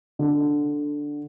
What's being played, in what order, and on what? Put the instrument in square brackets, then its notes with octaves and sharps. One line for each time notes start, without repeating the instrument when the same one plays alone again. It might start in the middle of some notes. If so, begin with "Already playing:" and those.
[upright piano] D3